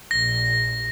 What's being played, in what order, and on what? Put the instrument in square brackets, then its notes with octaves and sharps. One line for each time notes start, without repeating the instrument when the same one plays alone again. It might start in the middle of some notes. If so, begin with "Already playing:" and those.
[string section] A#1 [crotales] A#6